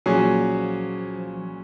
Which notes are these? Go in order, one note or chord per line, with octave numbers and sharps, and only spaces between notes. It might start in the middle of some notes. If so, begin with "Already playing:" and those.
A#2 F3 F#3 C#4 G#4